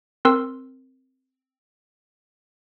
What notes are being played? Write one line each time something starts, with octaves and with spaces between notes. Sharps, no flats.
C4 A#4 C6 E6